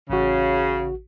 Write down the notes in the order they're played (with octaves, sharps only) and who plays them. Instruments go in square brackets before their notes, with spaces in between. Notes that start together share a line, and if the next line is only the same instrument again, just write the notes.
[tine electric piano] A1 F#4 [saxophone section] C#3